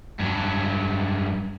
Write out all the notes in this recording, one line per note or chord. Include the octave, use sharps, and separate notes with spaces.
G2 F#3